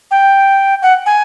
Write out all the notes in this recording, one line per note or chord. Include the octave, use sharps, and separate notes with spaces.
G5
F#5
G#5